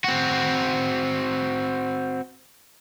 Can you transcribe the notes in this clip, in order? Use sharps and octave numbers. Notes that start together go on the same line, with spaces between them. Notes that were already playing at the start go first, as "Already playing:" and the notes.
C4 F#4